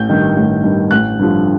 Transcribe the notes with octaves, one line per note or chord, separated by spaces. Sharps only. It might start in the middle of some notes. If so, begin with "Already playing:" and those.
Already playing: A1 G6
G2 D#3
A1
G2 D#3
A1 F#6
G2 D3 F3